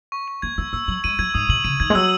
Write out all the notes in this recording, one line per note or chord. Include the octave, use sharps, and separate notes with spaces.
C#6
C#6
A#3 G#6
A#3 E6
A#3 E6
F#3 F#7
G#3 D#7
F#3 G#6
G#2 D#6
B2 F#7
C#3 D#7
D#3 G#6
G#3
F#3 E6